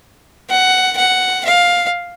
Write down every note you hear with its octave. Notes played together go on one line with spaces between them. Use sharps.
F#5
F#5
F5